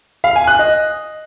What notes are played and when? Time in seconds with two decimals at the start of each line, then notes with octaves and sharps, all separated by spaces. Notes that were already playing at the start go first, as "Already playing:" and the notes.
0.24 F5
0.36 G#5
0.47 F#6
0.59 D#5